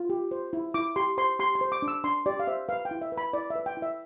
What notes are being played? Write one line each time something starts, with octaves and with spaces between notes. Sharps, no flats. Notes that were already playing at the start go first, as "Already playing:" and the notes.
Already playing: F4
G4
C5
E4
E4 D6
G4 C6
C5 C6
G4 C6
C6
C5
D6
D4
E6
D4 C6
G4 D5
F5
C5 E5
B4 F5
G5
E4
E5
B4
B5
E4 D5
E5
B4
G5
E4
E5